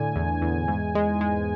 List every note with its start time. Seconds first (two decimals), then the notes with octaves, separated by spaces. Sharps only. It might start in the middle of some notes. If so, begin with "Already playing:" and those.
Already playing: A2 D3 G#5
0.16 E2
0.41 E2
0.68 G#2
0.95 G#3
1.21 G#3